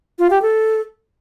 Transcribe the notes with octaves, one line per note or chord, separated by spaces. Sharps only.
F4
G4
A4